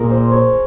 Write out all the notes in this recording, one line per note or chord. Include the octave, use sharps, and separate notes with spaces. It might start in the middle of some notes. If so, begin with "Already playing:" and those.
Already playing: A#2 G#4 A#4
C5
C#5